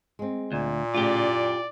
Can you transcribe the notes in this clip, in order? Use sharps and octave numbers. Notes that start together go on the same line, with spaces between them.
G#3 C4
D2 A#2
A2 C#3 F4 G4 D5
F#2